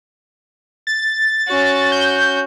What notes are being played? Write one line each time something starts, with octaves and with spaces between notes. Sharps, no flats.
A6
C#4 F#4
G6